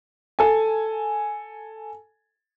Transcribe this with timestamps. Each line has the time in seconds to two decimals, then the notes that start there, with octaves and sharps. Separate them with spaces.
0.39 A4 G#5